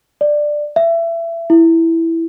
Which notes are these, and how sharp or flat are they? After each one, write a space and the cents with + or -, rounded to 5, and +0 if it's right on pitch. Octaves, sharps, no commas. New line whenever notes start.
D5 +10
E5 +25
E4 +0